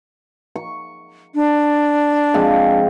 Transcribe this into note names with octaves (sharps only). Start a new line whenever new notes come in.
C#6
D4
F3 G#3 C4